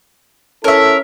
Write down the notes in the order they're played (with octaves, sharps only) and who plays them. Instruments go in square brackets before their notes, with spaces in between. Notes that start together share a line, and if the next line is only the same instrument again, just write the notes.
[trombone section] C#4 E4 A4 [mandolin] A#4 E5